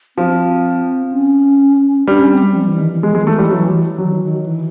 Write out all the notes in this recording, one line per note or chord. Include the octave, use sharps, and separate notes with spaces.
F3 C4
C#4
G3 D4
C#4
C4
G3
F3
E3
D#3
E3
F3 G#3
E3 G#3
D#3 A3
E3
G3
F#3
D#3 F#3
D#3
E3